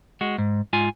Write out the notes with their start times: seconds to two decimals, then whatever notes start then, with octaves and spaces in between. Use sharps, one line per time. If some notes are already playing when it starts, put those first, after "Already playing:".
0.21 G#3 F#4
0.38 G#2
0.73 G#2 F4 G#5